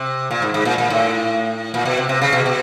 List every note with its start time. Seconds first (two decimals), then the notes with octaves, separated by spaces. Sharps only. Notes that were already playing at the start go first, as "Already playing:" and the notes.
Already playing: C3
0.31 A#2
0.42 G#2
0.54 G#2
0.65 A#2
0.78 A#2
0.90 A2
1.74 A#2
1.85 B2
1.97 C3
2.09 C3
2.21 C#3
2.33 B2
2.46 B2